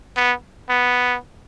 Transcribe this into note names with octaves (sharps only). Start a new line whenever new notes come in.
B3
B3